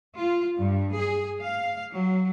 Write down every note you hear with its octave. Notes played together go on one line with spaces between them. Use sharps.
F4
G2
G#4
F5
F#3